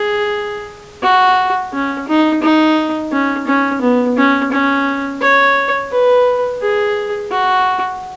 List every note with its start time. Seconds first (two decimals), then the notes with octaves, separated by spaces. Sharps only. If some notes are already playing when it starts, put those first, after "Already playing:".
Already playing: G#4
1.03 F#4
1.73 C#4
2.08 D#4
2.42 D#4
3.12 C#4
3.47 C#4
3.82 B3
4.18 C#4
4.52 C#4
5.22 C#5
5.92 B4
6.62 G#4
7.32 F#4